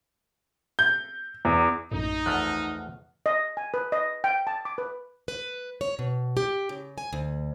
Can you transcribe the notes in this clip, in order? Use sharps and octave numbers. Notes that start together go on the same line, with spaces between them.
G6
E2
A#1 F#2 A2 D#4
E2 F3 A3 F#5 F6 F#6
D#5
G#5
B4
D#5
G5
A5
D6
B4
B4
C#5
B2
G4
C#3
G#5
D2